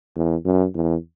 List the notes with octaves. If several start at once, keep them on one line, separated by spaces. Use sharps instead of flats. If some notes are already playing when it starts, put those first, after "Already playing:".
E2
F#2
E2